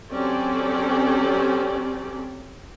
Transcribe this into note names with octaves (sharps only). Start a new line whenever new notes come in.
F#3 C4 C#4 G4 A4 D5